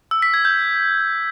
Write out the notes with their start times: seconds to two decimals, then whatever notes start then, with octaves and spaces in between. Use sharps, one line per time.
0.11 E6
0.22 B6
0.34 G#6
0.45 G6